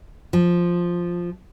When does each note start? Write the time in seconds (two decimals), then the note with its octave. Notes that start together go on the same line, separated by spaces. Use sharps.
0.33 F3